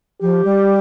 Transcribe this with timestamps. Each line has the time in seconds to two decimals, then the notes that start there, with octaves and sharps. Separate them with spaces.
0.22 F3 G4
0.44 G3